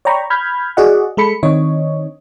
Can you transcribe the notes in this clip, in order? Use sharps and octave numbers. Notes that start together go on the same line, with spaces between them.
C#5 D5 G5 A#5 B5 C#6
B5 F6 G6 G#6
F#4 G#4 D5 D#5 F#5
G#3 A4 B5 C#7
D#3 C4 D4 C#5 D#5